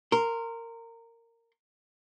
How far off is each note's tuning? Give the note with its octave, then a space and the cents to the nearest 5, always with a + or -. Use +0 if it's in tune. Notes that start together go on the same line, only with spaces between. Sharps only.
A#4 -15 C6 +0